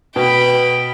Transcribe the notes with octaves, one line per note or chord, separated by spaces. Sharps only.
B2 B4 G5 B5